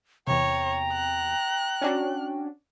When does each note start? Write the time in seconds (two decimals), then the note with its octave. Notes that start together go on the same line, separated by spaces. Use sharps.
0.27 E2 C3 C#5 G5 A#5
0.92 F#6
1.81 C#4 D4 F#4